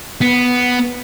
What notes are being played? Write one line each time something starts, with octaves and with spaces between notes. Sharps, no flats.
B3